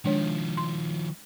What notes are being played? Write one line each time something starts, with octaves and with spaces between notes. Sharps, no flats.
D#3 F3 G#3 D4 C#5
C6